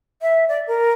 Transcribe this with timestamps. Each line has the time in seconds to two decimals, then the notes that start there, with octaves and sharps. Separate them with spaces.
0.22 E5
0.48 D5
0.67 A#4